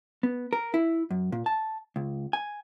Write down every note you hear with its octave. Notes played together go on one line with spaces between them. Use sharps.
B3
A#4
E4
F#2
A#2
A5
C#2
G#5